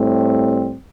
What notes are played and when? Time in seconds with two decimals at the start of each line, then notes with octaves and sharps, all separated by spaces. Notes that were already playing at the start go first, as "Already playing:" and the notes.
Already playing: A2 G3 C4